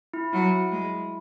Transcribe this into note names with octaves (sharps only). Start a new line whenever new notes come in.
E4
F#3 E4
G#3